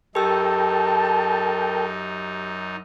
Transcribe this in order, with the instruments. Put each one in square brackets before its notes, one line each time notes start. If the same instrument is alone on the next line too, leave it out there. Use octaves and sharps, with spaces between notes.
[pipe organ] F#2 D#4 [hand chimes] G4 E6 [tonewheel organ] A4 A#4 G5 [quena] A5